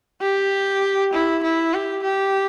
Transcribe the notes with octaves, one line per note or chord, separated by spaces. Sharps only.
G4
E4
E4
G4
G4